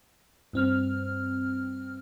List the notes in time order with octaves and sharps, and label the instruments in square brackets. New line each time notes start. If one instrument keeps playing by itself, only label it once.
[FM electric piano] G2 C4 F6